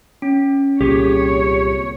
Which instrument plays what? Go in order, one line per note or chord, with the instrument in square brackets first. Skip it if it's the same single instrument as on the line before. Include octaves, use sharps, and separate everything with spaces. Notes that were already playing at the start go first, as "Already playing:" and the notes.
[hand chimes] C#4
[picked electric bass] C2 A#2 [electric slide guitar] G4 G#4 [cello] C#5